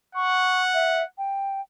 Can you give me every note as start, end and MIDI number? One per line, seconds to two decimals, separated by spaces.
0.15 1.06 78
0.15 0.62 85
0.74 1.03 76
1.18 1.61 79